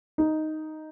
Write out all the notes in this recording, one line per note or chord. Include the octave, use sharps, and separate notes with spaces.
D#4